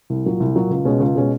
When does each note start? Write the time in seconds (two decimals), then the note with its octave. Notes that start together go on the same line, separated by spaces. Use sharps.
0.10 C2
0.26 A#2 F#3
0.40 C2
0.55 A#2 F#3
0.70 C#2
0.85 B2 G#3 C#4
1.00 C#2
1.15 B2 G#3 C#4